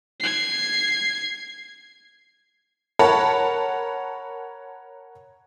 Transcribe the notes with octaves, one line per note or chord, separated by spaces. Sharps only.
G#6 C7
A#4 C#5 F#5 A5 B5